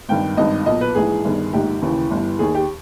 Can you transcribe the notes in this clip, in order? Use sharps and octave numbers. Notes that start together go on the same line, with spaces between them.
G#1 G2 D#3 G5
G#1 G2 D#3 D#5
B1 A#2 D#5
B4
A#1 G#2 E3 G#4
G1 G2 D#3
A#1 G#2 D#3 G4
D#2 C#3 E3
G1 G2 E3
D#2 D#3 G#4
G4